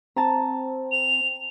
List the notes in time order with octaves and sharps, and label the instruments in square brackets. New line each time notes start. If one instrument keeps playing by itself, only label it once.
[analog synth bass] C4 [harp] A5 A#5
[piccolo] F7